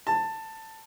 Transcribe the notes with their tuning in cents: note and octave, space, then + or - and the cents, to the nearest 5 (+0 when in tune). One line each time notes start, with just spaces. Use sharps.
A5 +15